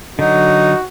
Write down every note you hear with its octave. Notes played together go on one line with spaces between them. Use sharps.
D3 F#3 D#4 F#4